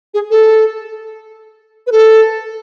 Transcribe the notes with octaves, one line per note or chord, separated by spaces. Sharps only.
G#4
A4
B4
A4